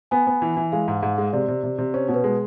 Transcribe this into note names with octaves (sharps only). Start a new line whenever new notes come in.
B3 G#5
B3
E3
E3
G#3 F5
G#2
G#2
G#3
C3 D5
C3
C3
C3
C#4 C5
B2
B4
G#3